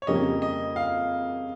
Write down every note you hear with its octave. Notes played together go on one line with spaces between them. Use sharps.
C#5
F2 C#3 G3 A#3 D#5
D#5
F5